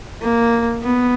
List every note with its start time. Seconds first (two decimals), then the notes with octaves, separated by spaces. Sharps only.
0.22 A#3
0.83 B3